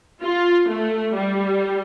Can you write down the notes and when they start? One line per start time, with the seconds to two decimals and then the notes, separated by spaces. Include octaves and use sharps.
0.23 F4
0.69 A3
1.15 G3